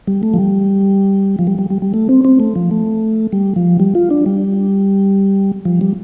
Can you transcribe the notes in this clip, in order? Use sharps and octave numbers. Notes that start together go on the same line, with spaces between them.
G3
A3
F3
G3
F3
G3
G3
G3
G3
A3
C4
C4
A3
F3
A3
G3
F3
G3
F4
D4
G3
F3
G3